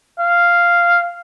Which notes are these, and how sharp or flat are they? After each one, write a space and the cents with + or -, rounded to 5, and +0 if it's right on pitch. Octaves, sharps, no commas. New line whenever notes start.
F5 -5